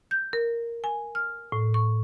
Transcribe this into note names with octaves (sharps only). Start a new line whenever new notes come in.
G6
A#4
G#5
F6
A2
C#6